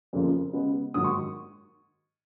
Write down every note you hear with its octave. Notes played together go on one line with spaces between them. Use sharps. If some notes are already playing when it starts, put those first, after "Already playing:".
F2 C#3 F3 A#3
C#3 G#3 B3
G#2 D#3 F#3 A#3 D#6
C#6